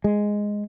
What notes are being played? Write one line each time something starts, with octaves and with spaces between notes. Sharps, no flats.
G#3